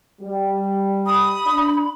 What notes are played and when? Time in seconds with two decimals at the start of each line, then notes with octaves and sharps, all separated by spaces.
0.21 G3
1.06 B5 D#6
1.45 D4